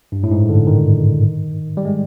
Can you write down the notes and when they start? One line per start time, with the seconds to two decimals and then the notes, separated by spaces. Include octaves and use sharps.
0.12 G2
0.23 A2
0.31 G#2
0.49 D3
0.67 D#3
1.77 G3
1.85 G#3